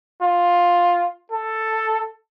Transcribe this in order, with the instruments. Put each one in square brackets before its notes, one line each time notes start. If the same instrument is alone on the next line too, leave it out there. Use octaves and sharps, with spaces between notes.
[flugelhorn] F4
A4